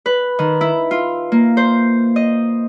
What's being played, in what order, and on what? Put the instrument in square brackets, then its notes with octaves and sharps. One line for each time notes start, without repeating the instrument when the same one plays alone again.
[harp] B4
D#3
E4
F4
A#3
C5
D#5